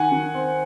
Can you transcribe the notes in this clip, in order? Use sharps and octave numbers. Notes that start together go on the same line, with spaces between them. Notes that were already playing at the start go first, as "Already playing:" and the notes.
Already playing: D#3 F#5 G#5
D#3
C4